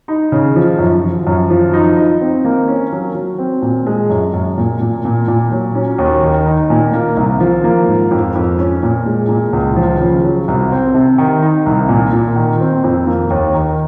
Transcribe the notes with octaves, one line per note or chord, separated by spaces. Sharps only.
D#4
C#3
F3
F#2
F3
F#2
F3
D#4
D#4
C4
A#3
C#4
F#3
F#3
C4
A#2
G#3
F#2
F#2
A#2
A#2
A#2
A#2
F#3
C#4
D#2
D#3
D#4
A#2
A#3
C2
F3
A#3
G#2
F2
F2
C#4
A#2
G#3
A#2
C#2
F3
C#3
F#3
C2
C4
C3
D#3
D#4
C2
A#2
A#2
D#3
C4
F2
A#3
D#2
D#3